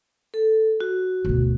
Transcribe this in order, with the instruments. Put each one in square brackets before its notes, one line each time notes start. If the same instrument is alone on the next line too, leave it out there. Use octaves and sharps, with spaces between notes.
[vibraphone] A4
F#4
[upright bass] D2 B2